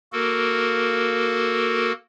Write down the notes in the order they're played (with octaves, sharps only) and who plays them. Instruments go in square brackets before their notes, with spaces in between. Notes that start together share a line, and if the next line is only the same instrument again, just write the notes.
[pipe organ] A#3 F#4 A4 A#4